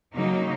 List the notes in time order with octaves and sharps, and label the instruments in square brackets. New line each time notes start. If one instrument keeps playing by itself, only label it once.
[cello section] C#3 F#3 A#3 D#4